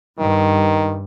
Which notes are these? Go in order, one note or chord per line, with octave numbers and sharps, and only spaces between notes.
G2 D#3